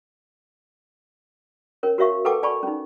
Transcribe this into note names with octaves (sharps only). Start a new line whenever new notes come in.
C#4 A#4 C#5
F#4 A#4 C#5 E5 F5 C#6
A4 B4 F#5 G5 A5 D6
D5 G#5 A5 B5 C#6
C#4 D#4